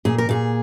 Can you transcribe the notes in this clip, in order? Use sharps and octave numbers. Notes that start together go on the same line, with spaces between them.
A#2 G#4
A#4
A#2 G#4